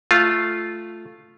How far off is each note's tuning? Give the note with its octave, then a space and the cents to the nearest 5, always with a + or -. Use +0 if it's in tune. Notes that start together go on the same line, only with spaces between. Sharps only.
A3 +0 F4 -5